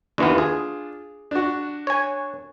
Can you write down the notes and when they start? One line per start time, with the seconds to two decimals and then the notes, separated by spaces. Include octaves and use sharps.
0.18 D#2 E3 B3 D4 F4
0.38 G#4
1.31 D4 F#4
1.87 C#5 G#5